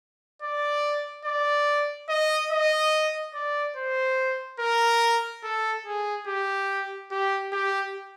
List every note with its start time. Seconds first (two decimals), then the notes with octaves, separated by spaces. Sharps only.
0.42 D5
1.25 D5
2.09 D#5
2.52 D#5
3.34 D5
3.76 C5
4.60 A#4
5.44 A4
5.86 G#4
6.27 G4
7.11 G4
7.52 G4